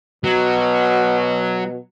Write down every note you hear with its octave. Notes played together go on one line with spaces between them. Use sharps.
B2 F#3